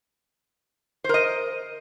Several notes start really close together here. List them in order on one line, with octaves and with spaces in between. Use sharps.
C5 A#4 D#5